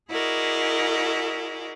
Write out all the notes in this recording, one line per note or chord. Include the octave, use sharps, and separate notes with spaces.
E4 F#4 G#4 A#4 D5 D#5